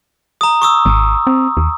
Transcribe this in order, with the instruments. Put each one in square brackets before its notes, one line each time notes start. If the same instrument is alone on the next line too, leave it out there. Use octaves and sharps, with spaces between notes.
[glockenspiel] A#5 D#6
C#6 D#6 E6
[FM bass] G#1
C4
D#2